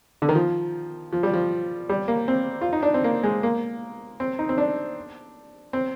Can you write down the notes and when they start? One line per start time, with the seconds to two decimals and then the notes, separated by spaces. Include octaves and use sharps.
0.22 D3
0.29 D#3
0.35 F3
1.13 F3
1.23 G3
1.34 F3
1.89 G3
2.08 A#3
2.28 C4
2.61 F4
2.73 D#4
2.83 D4
2.94 C4
3.04 A#3
3.23 G#3
3.43 A#3
4.20 C4
4.39 D#4
4.49 C4
4.58 D4
5.73 C4